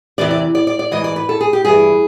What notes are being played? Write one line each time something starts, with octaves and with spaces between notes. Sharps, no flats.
E2 C3 E3 D5
D5
D5
D5
D5
G#2 E3 D#5
D5
B4
A4
G#4
G4
G2 E3 G#4